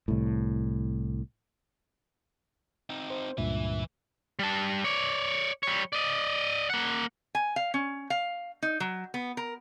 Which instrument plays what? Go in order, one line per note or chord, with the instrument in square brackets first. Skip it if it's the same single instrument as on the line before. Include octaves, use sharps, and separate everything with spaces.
[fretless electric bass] C2 A2
[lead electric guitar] C4 D#4
[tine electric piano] C5
[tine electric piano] C#2 G2 A#2 [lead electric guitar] E3 E5
[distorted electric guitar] G3 A5
C#5 D5
G3 C#5
D5 D#5
A#3 F#5
[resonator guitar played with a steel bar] G#5
F5
C#4
F5
D#4
F#3
B3
A#4